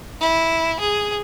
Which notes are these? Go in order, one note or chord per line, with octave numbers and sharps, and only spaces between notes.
E4
G#4